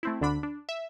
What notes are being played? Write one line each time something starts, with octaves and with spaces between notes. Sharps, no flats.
A3 C4 E4
D2 D3 D4 B5
D4
E5